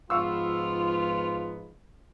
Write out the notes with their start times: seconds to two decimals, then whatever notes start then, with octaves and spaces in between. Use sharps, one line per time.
0.10 G#2 F3 B3 F4 F5 C#6 E6